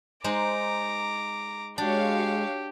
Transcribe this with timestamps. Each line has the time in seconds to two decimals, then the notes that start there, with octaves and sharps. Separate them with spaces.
0.24 G#3 D#4 C5 A#5 D6
1.78 G#3 D4 F#4 G4 C#5 F5